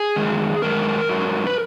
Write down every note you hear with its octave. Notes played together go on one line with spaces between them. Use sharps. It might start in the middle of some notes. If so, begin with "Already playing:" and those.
Already playing: G#4
F#2 D#3 G#3
F#2 D#3 G#3 A#4
G#2 F#3
B4